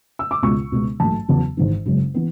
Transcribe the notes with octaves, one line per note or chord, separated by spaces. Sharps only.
E6
D6
C#2 B2 G#3 B3 C#6
C#2 B2 G#3 B3
A1 G#2 F#3 A3 A5
E2 C#3 F#3 B3
G#1 G#2 E3
F#1 F#2 C#3 G#3
E3 B3